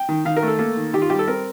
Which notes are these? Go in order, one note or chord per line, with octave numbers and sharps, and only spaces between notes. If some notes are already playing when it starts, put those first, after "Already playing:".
Already playing: G5
D#3
D#3 F5
A#4
A3
A4
A#3 A4
D#3
D#3 G4
F4
G3 G4
A4
C4 A#4